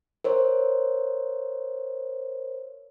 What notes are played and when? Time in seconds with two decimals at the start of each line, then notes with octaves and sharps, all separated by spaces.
0.24 A#4 C5 C#5